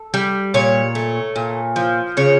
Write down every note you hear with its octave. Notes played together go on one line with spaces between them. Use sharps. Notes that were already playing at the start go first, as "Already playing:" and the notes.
Already playing: A4
G3
A#2 C#5
A3
A#2
F3
C#3 C#5